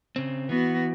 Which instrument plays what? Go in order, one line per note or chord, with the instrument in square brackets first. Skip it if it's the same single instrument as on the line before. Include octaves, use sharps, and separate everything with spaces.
[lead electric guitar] C#3 C4
[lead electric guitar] E3 [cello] B3 F#4